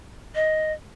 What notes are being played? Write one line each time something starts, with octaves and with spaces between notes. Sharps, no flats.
D#5